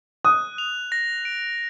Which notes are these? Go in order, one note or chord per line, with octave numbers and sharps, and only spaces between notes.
D#6 F#6
F7
A#6
D7